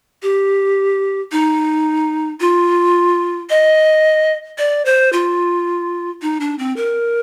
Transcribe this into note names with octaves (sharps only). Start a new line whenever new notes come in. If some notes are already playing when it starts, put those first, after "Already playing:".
G4
D#4
F4
D#5
D5
C5
F4
D#4
D4
C4
A#4